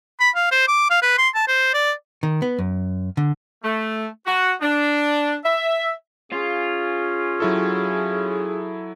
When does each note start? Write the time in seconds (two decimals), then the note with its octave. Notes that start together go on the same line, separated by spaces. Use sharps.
0.20 B5
0.35 F5
0.51 C5
0.68 D6
0.90 F5
1.02 B4
1.18 C6
1.35 A5
1.48 C5
1.74 D5
2.23 D#3
2.42 B3
2.59 F#2
3.17 D3
3.63 A3
4.26 F#4
4.62 D4
5.44 E5
6.32 C#4 F4 G#4
7.40 F#3 E4 A4